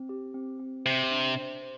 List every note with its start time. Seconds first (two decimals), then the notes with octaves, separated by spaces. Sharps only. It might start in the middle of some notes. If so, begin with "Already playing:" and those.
Already playing: C4
0.09 G4
0.34 C4
0.59 C4
0.85 C3 C5
1.11 D4
1.37 C5
1.62 C5